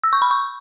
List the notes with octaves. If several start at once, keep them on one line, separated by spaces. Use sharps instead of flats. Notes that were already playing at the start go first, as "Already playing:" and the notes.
E6
C#6
B5
C#6